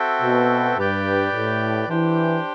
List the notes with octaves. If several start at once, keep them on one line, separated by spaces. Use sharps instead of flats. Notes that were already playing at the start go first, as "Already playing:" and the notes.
Already playing: C4 F#4 A4 E5 G5
B2
G2 G4 B4 D5 G5
A2
E3 D4 G4 C5 G5